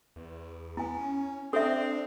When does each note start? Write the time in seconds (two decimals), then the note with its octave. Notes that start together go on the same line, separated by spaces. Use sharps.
0.16 E2
0.77 B3 E4 G#5
0.97 C#4
1.53 C4 D4 A4 E5